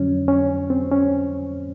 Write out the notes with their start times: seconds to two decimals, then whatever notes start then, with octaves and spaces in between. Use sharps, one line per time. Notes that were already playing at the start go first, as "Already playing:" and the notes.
Already playing: F2 D3 F#3 C#4
0.28 C#4
0.70 C4
0.91 C#4